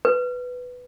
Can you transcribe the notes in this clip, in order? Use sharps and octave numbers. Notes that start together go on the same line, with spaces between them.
B4